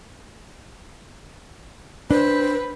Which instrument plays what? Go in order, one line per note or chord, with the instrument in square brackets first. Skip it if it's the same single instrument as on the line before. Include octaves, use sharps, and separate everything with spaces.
[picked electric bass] D4 [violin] B4 [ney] C5